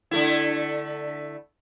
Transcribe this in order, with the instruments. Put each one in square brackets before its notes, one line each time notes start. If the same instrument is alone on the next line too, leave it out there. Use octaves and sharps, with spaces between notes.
[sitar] D3 A3 E4